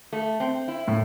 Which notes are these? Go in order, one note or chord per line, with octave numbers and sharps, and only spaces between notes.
A3
C4
E4
A2